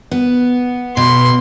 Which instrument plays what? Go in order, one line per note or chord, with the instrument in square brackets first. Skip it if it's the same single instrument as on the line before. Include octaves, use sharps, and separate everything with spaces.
[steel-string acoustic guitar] B3
[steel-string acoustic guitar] B2 [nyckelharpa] C6